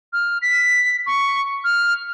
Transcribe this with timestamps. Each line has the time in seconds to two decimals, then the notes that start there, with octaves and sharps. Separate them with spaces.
0.13 F6
0.42 B6
1.07 C#6
1.64 F6